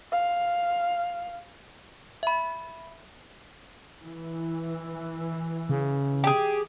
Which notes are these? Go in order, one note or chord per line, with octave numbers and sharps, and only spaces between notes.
F5
E5 B5
E3
C#3
G4 G#4